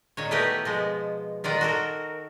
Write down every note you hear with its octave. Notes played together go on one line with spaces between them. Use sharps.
A#2 D#3 C#5
A3 B3 E4 G4 A#4 B4
B2 F3 G#3
A#2 D#3 F4 D5 F#5
F#4 A4 A#4